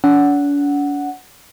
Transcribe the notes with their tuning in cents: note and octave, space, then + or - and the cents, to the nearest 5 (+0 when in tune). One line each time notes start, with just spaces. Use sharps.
D4 -45 F#5 +0